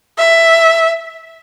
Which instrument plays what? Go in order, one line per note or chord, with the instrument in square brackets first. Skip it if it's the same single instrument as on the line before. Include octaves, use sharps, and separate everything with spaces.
[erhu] E5